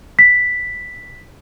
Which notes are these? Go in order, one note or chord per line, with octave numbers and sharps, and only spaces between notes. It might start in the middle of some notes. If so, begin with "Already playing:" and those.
B6